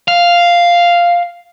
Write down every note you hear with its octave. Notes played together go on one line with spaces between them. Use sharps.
F5